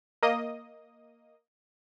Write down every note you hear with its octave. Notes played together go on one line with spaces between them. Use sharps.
A#3 D#5 D#6